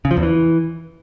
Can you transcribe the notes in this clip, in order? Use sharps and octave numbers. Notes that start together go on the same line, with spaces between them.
C#3
F3
E2
E3